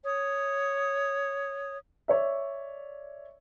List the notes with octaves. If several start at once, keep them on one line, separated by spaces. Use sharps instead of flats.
C#5 D#6
C#5 D5 E5